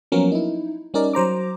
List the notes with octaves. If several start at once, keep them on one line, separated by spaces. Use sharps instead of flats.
F3 F#3 A#3 B3 C#4 A#4
D#4 E4
G3 C#4 D#4 A#4 D5
F#3 C5 A#5 D6